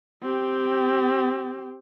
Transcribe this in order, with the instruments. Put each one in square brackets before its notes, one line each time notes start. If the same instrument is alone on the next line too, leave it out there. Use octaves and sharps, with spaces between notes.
[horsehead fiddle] C4 G4